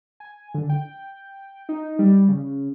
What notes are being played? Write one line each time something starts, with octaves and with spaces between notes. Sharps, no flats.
G#5
D3
G5
D#4
G3
C#3